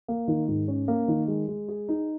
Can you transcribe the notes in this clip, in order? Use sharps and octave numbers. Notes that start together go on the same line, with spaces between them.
A#3
D#3
G#2
C#4
A#3
D#3
G#3
G#3
G#4
D#4